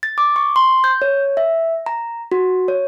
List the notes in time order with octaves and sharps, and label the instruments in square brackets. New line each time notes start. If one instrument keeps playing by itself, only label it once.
[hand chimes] A6
D6
C#6
C6
G6
C#5
E5
A#5
F#4
C#5